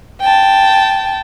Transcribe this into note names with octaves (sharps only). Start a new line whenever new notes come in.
G5 A5